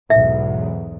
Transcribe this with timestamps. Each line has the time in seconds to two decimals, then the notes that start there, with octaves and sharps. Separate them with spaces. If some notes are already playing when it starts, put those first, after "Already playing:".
0.10 B1 E2 G#2 E5